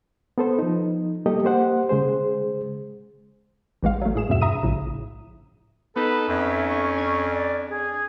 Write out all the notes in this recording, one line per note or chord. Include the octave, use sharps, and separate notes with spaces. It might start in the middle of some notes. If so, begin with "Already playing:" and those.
B3 A4 C5
F3 D#4
G3 A#3 G4 A4 D#5
A#3 G4 C5 F#5
C#3 G#3 G#4 C5
A1 E3 G#3 F5
F#3 A3
A2 G#4 E7
E2 G2 B2 E5 E7
E5 A#5 D#6 D#7
A#1 A2 C#3
B3 D#4 A4 B4
F2 C#4 E5
C#6
D4 G#6
D5
G#4